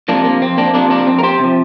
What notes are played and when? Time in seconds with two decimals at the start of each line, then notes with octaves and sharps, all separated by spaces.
0.08 C3 F3 A#3 D4
0.24 A#3
0.41 F2 C4
0.58 A#3 D4
0.74 C3 F3 A#3 D4
0.90 A#3 D4
1.07 F2 C4
1.19 A#4
1.23 G4 C5
1.39 C3 F3